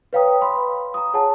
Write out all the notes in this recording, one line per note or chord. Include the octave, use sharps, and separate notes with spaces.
B4 C#5 F5 G5 A#5 D#6
F5 B5 C6
A#5 D#6
G#4 C#5 F#5 G#5 A5